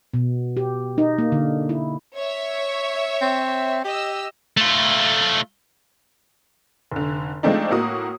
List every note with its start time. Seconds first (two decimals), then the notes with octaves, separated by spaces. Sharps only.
0.14 B2
0.57 G4
0.98 D#4
1.18 A#3
1.32 D3
1.69 E4
2.16 C#5 E5
3.21 C4
3.84 G4 D#5 E6
4.57 A3 F4
6.92 F1 D3
7.43 F3 G#3 A3 C4 D4 D#4
7.71 A2 A#3 F#4 D#6